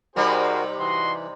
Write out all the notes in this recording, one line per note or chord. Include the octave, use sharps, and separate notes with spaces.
C3 G3 D#4 F#4 G#4 A#4 C5
E3 F#4 D#5 C6